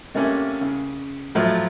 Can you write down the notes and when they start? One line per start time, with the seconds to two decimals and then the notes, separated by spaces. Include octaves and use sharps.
0.15 C3 A3 A#3 C#4
0.61 C#3
1.35 A2 F3 F#3 A3